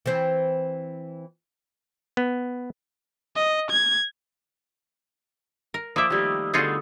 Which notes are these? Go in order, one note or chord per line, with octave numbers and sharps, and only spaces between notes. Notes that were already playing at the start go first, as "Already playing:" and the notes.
E3 C4
B3
D#5
G#6
A#4
F3 A#3 D5 E5 D#6 E6
D#3 G3 A3 A#3 G4
D3 A3 B3 D#4 F4 F#4 G#4